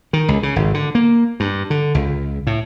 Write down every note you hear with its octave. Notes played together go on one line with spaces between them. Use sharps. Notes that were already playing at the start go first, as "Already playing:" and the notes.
D#3
C#2
C#3
G#1
D3
A#3
G2
D3
C#2
A2